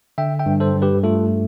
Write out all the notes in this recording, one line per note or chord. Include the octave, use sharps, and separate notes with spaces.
D3 E5 G5
E5 G5
G2
A4 C5
G2
G4 B4
A3 F4 A4